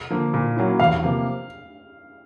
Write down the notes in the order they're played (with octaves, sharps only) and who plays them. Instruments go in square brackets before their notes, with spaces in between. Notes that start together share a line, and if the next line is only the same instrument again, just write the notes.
[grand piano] D3 F3 A#3
A#2
F#3 A#3 C#4 E4
[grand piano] E2 [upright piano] F5
[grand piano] C3 F3 A#3